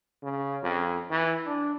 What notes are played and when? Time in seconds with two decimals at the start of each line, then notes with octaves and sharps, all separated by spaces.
0.23 C#3
0.63 F2
1.11 E3
1.46 D4